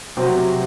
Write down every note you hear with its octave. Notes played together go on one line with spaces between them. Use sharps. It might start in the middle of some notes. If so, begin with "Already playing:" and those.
C3 F#3 C4 F#4